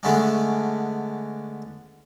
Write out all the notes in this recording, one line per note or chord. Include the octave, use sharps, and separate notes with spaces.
D3 G#3 A3 B3 C#4 D4